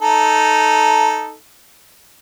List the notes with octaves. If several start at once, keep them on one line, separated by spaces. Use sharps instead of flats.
D#4 A4